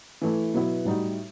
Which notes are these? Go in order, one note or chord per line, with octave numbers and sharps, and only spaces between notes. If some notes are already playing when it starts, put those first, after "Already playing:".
E3 A3 E4
B2 F#3 B3 E4 B4
A2 G3 D#4 F#4